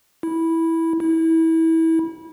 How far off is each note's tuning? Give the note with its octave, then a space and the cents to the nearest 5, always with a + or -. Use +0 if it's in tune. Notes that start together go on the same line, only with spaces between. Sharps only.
E4 -10
E4 -25